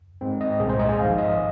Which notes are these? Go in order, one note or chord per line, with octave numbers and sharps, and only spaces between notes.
G#2 G#3 C4
D#5
C2 A#2 G#3 G#4
C5
D#5
G#5
G#1 G#2 F3 F5
D#5